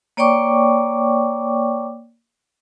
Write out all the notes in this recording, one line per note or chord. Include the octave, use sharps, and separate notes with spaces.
A#3 C#5 D5 G5 C#6 D6